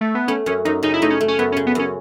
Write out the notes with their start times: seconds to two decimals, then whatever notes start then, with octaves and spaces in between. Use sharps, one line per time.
0.01 A3
0.15 B3
0.28 A3 C#4
0.46 F#2 C#4
0.65 F#2 D#4
0.83 C#3 D#4
0.93 E4
1.02 A3 D#4
1.10 C#4
1.21 A3
1.28 C#4
1.39 F#2 B3
1.52 C#4
1.57 C#3
1.66 B3
1.75 F#2 C#4